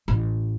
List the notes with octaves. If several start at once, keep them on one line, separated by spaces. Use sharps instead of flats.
A1